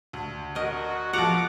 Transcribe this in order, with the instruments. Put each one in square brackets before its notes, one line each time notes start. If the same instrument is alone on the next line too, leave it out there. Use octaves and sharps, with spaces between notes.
[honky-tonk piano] D2
[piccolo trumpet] F#4 [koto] A#4 D#5
[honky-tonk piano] F3 F#4 [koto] F#5 A#5 [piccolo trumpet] D6